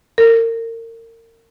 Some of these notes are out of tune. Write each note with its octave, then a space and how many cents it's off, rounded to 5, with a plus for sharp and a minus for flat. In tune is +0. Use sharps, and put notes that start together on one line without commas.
A#4 -35